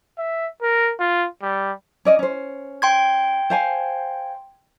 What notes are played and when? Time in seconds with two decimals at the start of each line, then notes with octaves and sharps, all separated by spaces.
0.18 E5
0.62 A#4
1.00 F4
1.42 G3
2.05 C#4 D5 D#5
2.19 C#4 C5
2.82 G5 C6 G#6
3.50 C5 F5 G#5